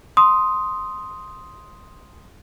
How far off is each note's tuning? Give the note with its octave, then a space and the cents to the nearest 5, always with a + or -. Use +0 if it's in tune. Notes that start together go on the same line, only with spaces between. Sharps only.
C6 +0 D#6 +5